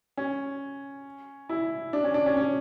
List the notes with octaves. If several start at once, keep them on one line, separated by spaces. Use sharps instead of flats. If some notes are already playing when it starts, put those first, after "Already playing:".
C#4
E4
D4
C#4
D4
C#4
C#4